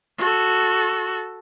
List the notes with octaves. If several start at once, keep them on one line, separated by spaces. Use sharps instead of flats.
F#4 A4